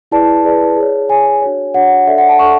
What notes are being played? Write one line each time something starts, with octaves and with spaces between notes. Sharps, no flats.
E4 G#4 B4 D5 A5
E4 G#4 B4 D5
G#4 C#5
G#4 C#5 G#5
D4 F#4 C#5
D4 F#4 C#5 F#5
D4 A4 D5 E5
F#5
A5
D4 A4 D5 C#6